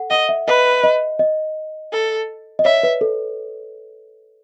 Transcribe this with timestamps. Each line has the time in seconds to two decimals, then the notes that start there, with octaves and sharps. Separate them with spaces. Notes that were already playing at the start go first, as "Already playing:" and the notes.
Already playing: A4 F#5
0.10 D#5 F#5
0.29 E5
0.47 B4 D#5
0.83 D#5
1.19 D#5
1.93 A4
2.59 D#5
2.65 C#5 E5
2.83 B4
3.01 A4